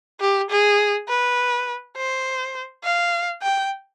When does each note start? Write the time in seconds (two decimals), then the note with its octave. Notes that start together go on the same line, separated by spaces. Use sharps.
0.21 G4
0.50 G#4
1.09 B4
1.97 C5
2.84 F5
3.43 G5